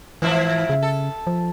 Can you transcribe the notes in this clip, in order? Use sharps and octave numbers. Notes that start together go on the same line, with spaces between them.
G#2 E3 F3 E4
C#3
A4
F3